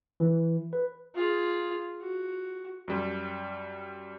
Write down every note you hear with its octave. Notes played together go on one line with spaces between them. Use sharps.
E3
B4
F4 G#4
F#4
F#2 G3